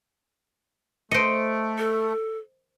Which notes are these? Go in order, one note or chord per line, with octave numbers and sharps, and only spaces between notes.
A3 C5 D#5 C#7 D7
A4